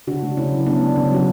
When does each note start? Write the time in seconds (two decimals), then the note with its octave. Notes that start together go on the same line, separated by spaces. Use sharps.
0.07 C#3 D4 F#4
0.23 A3
0.37 C#3 C#4 E4
0.52 F#3
0.66 C#3 B3 D4
0.81 A3
0.96 C#3 C#4
1.11 F#3 F#4